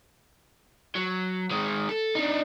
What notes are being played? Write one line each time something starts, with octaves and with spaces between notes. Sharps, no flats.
F#3
D#3 G#3
A4
D4 D#4